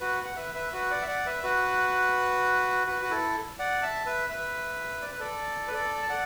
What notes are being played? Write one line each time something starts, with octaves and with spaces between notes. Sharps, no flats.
F#4 B4
F#5
B4 E5
B4 E5
F#4 B4
D5 F#5
E5
D5 F#5
B4 E5
F#4 B4
F#4 B4
F#4
E4 A4
D5 F#5
E5 A5
B4 E5
B4 E5
D5
B4
A4 D5
B4
A4 D5
A5
D5 F#5